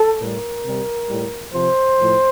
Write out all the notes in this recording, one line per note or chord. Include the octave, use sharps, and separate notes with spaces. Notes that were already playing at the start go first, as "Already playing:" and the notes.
Already playing: A4
A2 G3 A#4
C3 G3
A2 G3
C3 F3 C5
A2 F3